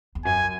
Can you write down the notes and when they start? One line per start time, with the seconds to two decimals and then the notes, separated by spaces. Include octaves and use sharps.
0.15 E2
0.25 F#2 G#5